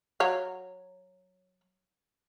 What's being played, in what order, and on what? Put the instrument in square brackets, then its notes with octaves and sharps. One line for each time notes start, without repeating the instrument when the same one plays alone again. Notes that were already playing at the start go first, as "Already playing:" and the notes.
[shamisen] F#3 C#5 F5